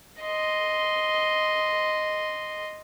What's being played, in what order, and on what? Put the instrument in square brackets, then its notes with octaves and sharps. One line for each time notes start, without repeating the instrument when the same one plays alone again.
[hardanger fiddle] D#5 C6